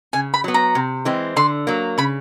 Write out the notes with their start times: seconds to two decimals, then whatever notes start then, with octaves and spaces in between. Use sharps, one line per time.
0.13 C#3 G#5
0.34 B5
0.44 F#3 B3
0.54 A#5
0.75 C3
1.05 E3 G#3 C4
1.36 D3 C6
1.67 F#3 A#3
1.98 C#3 B5